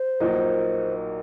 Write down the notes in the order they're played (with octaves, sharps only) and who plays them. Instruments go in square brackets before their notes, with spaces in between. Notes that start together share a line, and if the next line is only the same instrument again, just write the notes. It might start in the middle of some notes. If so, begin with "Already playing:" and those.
Already playing: [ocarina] C5
[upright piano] A#1 A#2 F#3 A#3 D#4